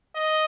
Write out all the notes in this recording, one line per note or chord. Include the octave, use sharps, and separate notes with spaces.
D#5